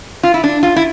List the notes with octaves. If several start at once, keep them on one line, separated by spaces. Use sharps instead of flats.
F4
E4
D4
F4
E4